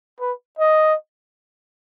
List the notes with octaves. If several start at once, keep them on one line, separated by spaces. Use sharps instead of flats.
B4
D#5